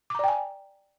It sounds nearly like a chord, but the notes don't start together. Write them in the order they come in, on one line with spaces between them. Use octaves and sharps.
D6 A#5 D5 G5 G#5